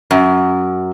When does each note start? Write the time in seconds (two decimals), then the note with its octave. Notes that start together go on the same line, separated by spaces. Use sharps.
0.11 F#2